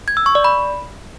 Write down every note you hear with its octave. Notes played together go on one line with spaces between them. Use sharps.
G#6
E6
C#6
D5
B5